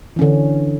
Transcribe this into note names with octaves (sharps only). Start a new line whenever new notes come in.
D3 E3 C#4